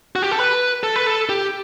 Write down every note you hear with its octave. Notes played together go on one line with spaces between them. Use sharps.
F#4
G4
A4
B4
A4
B4
A4
G4